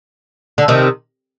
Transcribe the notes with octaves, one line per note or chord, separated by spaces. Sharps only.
D3
C3 D#3